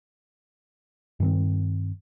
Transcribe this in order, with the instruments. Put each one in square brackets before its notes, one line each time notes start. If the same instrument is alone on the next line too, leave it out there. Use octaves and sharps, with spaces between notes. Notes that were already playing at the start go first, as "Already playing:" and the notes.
[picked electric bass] G2 D#3 C4